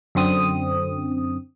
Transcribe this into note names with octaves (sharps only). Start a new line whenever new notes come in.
F#2 D3 C4 D#6